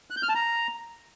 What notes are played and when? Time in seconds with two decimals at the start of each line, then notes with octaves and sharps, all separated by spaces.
0.10 F#6
0.17 G6
0.23 F6
0.29 A5
0.35 A#5